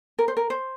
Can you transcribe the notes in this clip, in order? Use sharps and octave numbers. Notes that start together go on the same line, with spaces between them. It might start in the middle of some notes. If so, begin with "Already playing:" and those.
A#4
C5
A#4
C5